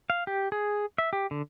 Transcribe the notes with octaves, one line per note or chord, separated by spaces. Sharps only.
F5
G4
G#4
E5
G4
D3